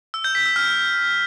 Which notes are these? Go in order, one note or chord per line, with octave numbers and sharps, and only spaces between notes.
E6
G6
B6
E6
F6